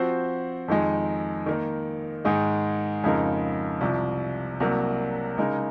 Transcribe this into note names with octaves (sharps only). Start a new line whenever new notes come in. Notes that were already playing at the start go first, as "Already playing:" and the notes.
Already playing: F3 C4 F#4 C5
F2 D#3 G#3 D#4
D#3 A#3 D#4
G#2 D#3 G#3 D#4 G#4
F2 C#3 G#3 D#4 A#4
C2 C3 F3
C2 C3 F#3 A#3
C#3 G#3 D#4 A#4